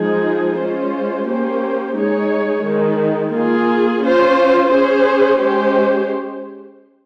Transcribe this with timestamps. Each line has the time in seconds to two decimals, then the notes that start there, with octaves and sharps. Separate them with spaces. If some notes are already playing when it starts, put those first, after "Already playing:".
Already playing: F3 G#3 D#4 G#4
0.58 G#3 C#4 F4 C5
1.26 A#3 C#4 G4 C5
1.95 G#3 D#4 G#4 C#5
2.64 D#3 G#3 D#4
3.32 A#3 F4 G#4
4.01 C#4 F4 C5
4.69 C#4 G#4 C5
5.38 G#3 C#4 G4 C5